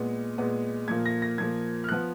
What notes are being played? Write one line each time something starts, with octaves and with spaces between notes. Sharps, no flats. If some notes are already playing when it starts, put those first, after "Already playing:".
Already playing: A#2 G#3 B3
A#2 G#3 B3
A#2 F3 A#3 G#6
A#6
A#6
A#2 F3 A#3 G#6
F6
F3 B3 F#6